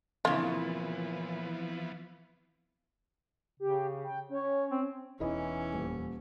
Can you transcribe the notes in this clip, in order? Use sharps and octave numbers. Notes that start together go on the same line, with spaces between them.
A#2 C#3 E3 F3 B3 C4 E4 F4
C#3 G4
G5
C#4 C#5
C4
E1 E2 E3 C#4 D#4 E4 D#5
D#1